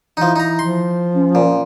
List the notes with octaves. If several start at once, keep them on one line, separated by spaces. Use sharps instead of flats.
E3 F3 D#4
D#4 A#5
F3 C6
C#4
A#2